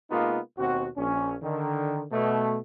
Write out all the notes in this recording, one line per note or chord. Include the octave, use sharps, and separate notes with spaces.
C3 G#3 A#3 B3 D#4 F4
D#2 B2 C4 F#4
A#1 C#4
D3 D#3
B2 A3